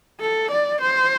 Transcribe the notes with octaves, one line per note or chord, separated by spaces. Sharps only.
A4
D5
C5